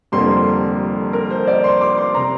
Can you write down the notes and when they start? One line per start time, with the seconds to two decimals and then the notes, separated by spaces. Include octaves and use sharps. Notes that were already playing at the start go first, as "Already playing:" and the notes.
0.12 F1 F2 D3 G3 A#3 C6
1.13 A#4
1.30 C5
1.47 D5
1.64 C6
1.81 D6
1.98 C6
2.15 C3 A#5